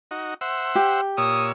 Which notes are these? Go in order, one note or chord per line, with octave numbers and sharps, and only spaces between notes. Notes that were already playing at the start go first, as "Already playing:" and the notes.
D#4 F#4
C5 E5 F#5
G4
A#2 C#5 D#6 E6